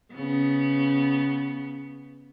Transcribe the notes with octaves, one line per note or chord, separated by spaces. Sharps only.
C#3 B3